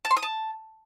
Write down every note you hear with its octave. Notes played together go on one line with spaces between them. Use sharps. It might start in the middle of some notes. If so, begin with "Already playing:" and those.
A5
C6
D#6
A5